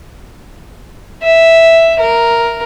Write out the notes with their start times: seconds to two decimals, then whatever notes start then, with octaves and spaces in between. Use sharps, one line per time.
1.23 E5
1.99 A#4